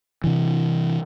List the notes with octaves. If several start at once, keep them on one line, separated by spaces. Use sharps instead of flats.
C3 E3